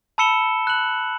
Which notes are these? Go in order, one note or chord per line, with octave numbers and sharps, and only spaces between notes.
A5 B5 E6 C#7 E7 G7
F#6 F#7